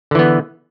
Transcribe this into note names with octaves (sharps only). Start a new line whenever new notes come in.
D3 E3 B3